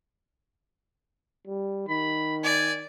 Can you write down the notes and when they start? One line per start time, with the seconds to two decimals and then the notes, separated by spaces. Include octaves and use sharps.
1.47 G3
1.88 D#3 B5
2.44 D5 G#5